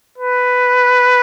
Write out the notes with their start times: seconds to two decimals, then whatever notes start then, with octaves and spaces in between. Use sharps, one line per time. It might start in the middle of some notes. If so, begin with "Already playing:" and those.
0.18 B4